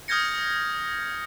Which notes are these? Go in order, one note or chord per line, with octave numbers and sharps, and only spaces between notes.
D#6 F6 G6 G#6 A#6 C#7